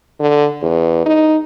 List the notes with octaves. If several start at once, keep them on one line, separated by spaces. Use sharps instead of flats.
D3
E2
D#4